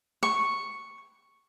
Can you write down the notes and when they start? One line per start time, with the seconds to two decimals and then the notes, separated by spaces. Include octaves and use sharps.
0.23 C#6